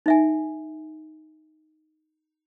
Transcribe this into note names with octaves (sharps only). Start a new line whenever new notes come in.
D#4 E5 G#5